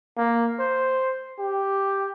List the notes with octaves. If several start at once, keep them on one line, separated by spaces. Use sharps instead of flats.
A#3
C5
G4